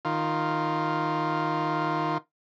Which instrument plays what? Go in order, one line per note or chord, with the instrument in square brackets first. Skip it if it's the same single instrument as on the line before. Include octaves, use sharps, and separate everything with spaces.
[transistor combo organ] D#3 F4